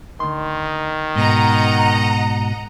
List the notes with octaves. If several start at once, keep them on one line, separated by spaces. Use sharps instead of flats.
D2 D#3 C6
G#2 B2 B3 D#5 F#5 A#5